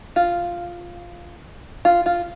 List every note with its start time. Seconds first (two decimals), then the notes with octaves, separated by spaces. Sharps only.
0.16 F4
1.85 F4
2.06 F4